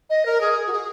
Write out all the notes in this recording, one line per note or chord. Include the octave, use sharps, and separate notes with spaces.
D#5
A#4
G#4
F#4
G#4